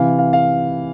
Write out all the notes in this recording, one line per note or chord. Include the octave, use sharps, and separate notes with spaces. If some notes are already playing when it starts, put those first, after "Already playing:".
Already playing: C3 E3 F5
F5
F5